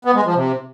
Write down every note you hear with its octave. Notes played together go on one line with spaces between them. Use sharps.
B3
G#3
F3
C3